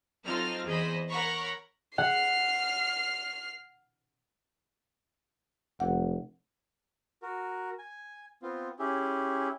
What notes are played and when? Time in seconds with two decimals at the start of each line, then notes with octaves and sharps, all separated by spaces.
0.25 F#3 C4 D#4 F4 A4 F6
0.66 E2 G#4 C5 D#5 B5
1.08 A#4 C#5 F#5 A#5 B5 C#6
1.98 F#5 F6 C7
5.80 F1 F#5
7.22 F#4 A#4
7.79 G#5
8.42 B3 C4 F4
8.79 C#4 E4 G4 G#4